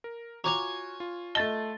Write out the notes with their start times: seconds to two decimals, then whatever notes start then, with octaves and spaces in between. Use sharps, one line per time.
0.04 A#4
0.44 F4 F#4 C#5 G#5 A#5 D6 F7
1.00 F4
1.35 A3 D#5 A5 A6 G7